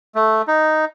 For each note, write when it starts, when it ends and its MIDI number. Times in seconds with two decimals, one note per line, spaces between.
0.15 0.42 57
0.47 0.85 63